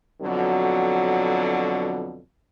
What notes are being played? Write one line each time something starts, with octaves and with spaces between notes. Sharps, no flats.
F2 B2 D3 F#3